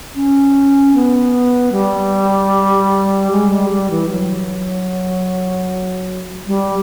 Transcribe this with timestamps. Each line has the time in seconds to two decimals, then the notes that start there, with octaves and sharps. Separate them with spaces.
0.15 C#4
0.94 B3
1.72 G3
3.31 G#3
3.50 G3
3.70 G3
3.90 E3
4.10 F#3
6.47 G3